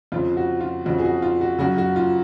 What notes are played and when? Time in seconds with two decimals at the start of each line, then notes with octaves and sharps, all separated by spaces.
0.12 F2 C#3 F4
0.37 F#4
0.61 F4
0.85 F2 C#3 F#4
0.99 G#4
1.04 F#4
1.22 F4
1.41 F#4
1.59 F#2 C#3 F#4
1.78 F#4
1.96 F4